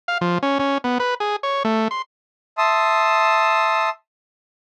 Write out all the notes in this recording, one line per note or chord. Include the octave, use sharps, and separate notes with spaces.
F5
F3
C#4
C#4
B3
B4
G#4
C#5
A3
C6
E5 A5 C6 D#6